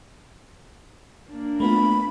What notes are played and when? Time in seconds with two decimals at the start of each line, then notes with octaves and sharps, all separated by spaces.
1.30 A#3 D4
1.60 A3 B3 F4 B5